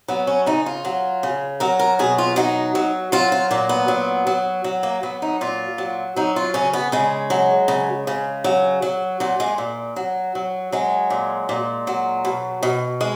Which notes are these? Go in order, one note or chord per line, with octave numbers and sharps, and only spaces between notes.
F#3 B3
C#4
C#3 D#4
F4
F#3
C#3
F#3 A#4
A#4
B2 G#4
F4
F#3 D#4
F#3
F#3 F4
F4
A#2 A#3
B3
F#3
F#3
F#3
A#3
F#3 B3
D#4
A#2 F4
F#3
F#3 D#4
F4
C#3 C#4
B3
C#3 G#3
F#3
C#3
C#3
F#3
F#3
A#2 F#3
G#3
A#2
F#3
F#3
F#3 G#3
A#2
A#2
F#3
B2
B2
G#3